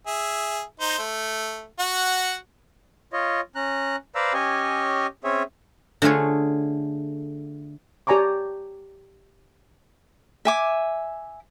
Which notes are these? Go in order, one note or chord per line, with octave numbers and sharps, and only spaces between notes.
G#4 E5
D#4 C5
A3
F#4 F#5
F4 C#5 D#5
C#4 A#5 F#6
B4 C5 D5 F5 A#5 E6
C#4 G4 C#5 D#5 G#5
C4 C#4 G#4 C#5 E5
D3 A3 F4 G#4 C#5
G4 D5 G#5 A#5 C#6 D6
E5 G#5 D6